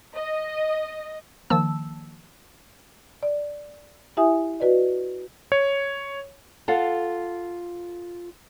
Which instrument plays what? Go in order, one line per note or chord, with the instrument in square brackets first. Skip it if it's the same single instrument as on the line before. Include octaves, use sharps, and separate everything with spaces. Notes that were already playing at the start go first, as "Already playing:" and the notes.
[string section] D#5
[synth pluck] D#3 F3 A#3 A5 E6
[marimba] D5
E4 G4 E5 G#5 D#6
F#4 B4 D5 D#5
[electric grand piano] C#5
[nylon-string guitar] F4 A4 F5 F#5